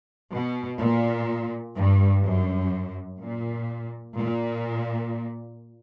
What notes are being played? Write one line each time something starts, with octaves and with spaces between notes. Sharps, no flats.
B2
A#2
G2
F#2
A#2
A#2